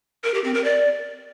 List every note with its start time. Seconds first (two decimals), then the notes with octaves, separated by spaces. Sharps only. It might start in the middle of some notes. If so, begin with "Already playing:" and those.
0.24 A#4
0.34 G4
0.44 C4
0.54 A#4
0.64 D5